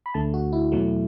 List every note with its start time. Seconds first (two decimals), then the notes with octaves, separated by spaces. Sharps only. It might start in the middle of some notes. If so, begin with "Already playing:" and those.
0.06 B5
0.14 D2 D3 A3 A5
0.34 F#4
0.53 E4
0.72 E2 B2 F#3 A3